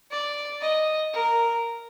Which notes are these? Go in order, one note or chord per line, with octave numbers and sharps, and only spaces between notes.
D5
D#5
A#4